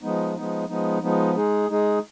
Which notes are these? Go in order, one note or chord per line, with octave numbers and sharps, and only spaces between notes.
F3 G#3 B3 D#4
F3 G#3 B3 D#4
F3 G#3 B3 D#4
F3 G#3 B3 D#4
G#3 D#4 G#4
G#3 D#4 G#4